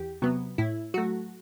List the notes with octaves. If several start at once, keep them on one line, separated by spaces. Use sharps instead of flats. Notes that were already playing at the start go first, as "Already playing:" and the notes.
Already playing: E2 G4
C3 F#3 B3
A2 E4
F#3 A3 F#4